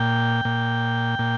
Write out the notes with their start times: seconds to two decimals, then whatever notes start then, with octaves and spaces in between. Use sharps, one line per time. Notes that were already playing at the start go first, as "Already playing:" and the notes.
Already playing: A#2 G5
0.45 A#2
1.19 A#2